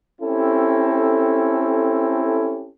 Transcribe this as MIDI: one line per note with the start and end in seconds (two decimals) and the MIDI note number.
0.21 2.70 60
0.21 2.70 61
0.21 2.70 64
0.21 2.70 67
0.21 2.70 69